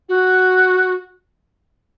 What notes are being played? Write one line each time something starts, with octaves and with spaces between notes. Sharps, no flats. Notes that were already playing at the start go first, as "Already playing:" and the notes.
F#4